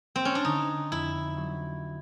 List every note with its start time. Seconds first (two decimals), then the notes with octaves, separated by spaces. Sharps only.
0.16 C4
0.25 C#4
0.35 D4
0.45 D3 D#4
0.91 F2 E4
1.37 F#3